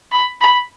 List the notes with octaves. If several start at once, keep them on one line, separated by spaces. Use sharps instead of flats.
B5
B5